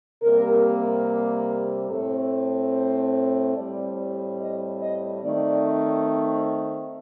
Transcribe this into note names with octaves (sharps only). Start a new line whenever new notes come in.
C3 G3 A#3 A#4
A2 A3 C4 A4
C5
A2 G3 C4 D5
D#5
D#5
D#3 A3 C4 D5